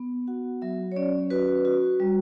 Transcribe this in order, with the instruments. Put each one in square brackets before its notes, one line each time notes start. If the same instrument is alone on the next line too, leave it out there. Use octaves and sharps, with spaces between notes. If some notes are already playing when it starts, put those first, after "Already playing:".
Already playing: [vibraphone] B3
F#4 F#5
F#3 E5
C#5
C#4 D5
F#4 B4
F#4
G3